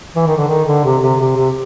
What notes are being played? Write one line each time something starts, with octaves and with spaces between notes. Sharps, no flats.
E3
D#3
D3
D#3
D3
C3
C3
C3
C3